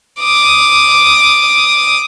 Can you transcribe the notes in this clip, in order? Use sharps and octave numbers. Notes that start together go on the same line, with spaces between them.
D6 D#6